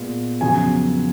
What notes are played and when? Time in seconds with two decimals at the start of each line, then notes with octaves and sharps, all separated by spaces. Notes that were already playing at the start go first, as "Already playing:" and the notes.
Already playing: A#2 G#3 B3
0.41 F2 C#3 F#3 B3 G#5